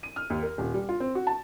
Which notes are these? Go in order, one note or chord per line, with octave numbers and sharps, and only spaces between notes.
D#7
F6
D#2
A#4
D#1
G3
F4
C4
F#4
A5